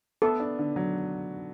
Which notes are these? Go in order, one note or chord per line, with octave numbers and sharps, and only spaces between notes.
B3 A4
D4
D3
F#3